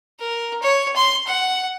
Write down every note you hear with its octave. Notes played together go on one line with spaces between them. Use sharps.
A#4
C#5
C6
F#5